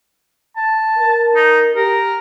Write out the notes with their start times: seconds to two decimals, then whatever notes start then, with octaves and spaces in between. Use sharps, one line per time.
0.57 A5
0.97 A#4
1.35 D#4
1.75 G4 A#4